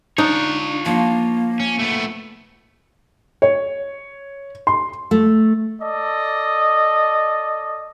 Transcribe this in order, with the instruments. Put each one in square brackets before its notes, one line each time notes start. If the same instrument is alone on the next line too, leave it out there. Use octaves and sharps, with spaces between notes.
[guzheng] D4 [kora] D#4 [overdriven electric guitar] F4 C#5
[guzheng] F3 [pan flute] A#3
[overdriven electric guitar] C#4
A3 B3
[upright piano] C#5
C6
[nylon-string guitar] A3
[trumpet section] A4 D5 D#5